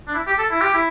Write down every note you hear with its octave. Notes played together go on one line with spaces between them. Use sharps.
D4
E4
G4
A4
E4
G4
E4